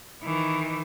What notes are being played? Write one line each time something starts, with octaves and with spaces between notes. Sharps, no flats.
D#3 E3